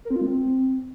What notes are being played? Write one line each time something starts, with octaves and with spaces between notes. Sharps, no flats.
A#4
C4
F4
G#3
C4